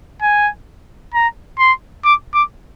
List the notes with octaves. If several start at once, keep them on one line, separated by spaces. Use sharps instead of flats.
G#5
A#5
C6
D6
D6